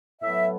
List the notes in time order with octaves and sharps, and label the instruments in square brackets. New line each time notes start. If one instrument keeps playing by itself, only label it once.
[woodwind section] A2 F#3 B3 E5